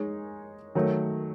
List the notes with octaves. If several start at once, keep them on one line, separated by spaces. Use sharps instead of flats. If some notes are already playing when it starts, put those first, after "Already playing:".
Already playing: G#3 D#4 G#4 C#5
D#3 F#3 A3